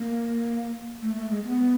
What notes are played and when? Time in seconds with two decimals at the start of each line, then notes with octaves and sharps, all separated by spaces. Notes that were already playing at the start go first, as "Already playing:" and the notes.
Already playing: A#3
1.02 A3
1.16 A3
1.30 G#3
1.45 B3